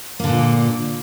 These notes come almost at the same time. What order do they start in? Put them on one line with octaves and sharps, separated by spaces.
A#3 D3 A#2